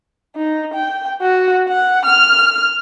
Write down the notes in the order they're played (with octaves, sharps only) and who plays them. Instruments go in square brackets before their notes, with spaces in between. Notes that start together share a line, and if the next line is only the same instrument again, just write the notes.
[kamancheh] D#4
G5
F#4
F#5
F6